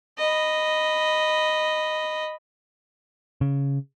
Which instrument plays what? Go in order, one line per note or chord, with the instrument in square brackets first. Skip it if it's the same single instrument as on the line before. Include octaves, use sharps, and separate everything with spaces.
[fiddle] D#5 B5
[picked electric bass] C#3